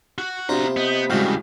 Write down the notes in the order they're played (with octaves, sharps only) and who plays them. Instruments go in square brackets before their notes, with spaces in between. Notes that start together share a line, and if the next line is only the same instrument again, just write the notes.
[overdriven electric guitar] F#4
[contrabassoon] C3 [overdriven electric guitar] B3 A#5 [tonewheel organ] D4 F#4 [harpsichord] F4 C5
[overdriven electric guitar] B3 [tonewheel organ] D#5 G6
[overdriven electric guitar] A2 C#3 [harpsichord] G3 G#3 F#4 [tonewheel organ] G4 F5 G5